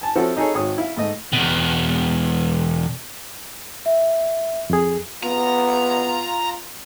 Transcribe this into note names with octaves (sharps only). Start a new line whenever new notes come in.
G#5 A5
F3 C4 E4 F#4 A4 C#5
D#4 G#4 A4 C#5
G#1 C#5 D#6
E4 F5
G#2 A3 D#5
E2 B2
E5
F2 G#4
B3 F4 A#5